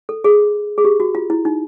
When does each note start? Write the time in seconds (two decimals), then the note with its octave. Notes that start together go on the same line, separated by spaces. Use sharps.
0.09 A4
0.24 G#4
0.78 G#4
0.85 G4
1.00 F#4
1.15 F4
1.30 E4
1.45 D#4